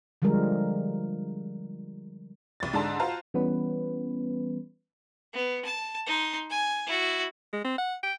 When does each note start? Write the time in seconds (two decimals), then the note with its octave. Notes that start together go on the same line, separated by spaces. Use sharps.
0.22 D3 F3 G3 G#3 A#4
2.60 C2 A6
2.73 G#2 D3 D4 A5 C6
2.99 F4 F#4 C5 F5 A5 A#5
3.34 E3 G3 B3 C#4 B4
5.33 B3
5.65 A5
6.06 D#4 C6
6.51 G#5
6.86 E4 F#4
7.53 G#3
7.64 C4
7.78 F#5
8.03 G5